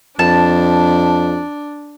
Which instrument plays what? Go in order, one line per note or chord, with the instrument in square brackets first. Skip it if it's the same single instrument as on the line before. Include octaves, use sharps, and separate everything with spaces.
[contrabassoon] F2 [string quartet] D4 [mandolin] A5